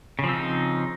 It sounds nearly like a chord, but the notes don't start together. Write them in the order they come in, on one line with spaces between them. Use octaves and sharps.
C#3 F3 C4 D#4